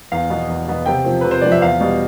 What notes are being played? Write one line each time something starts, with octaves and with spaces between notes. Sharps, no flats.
E2 F5
B2 B3
E2
B2 B3
C3 G5
F3 C4
C3 B4
C5
F3 C4 D5
E5
E2 F5
B2 G3